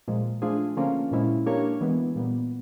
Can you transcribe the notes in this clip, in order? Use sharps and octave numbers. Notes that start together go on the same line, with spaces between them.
A#2 F3 G#3
F3 A3 D4 F4 G#4
D3 F3 A#3 C#4 F4
A#2 F3 G#3 C#4 E4
A#3 D4 G4 A#4 C#5
E3 G#3 B3
A#2 G3 B3